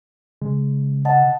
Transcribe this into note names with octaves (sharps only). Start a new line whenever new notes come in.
C#3 G#3
D#5 F#5 A5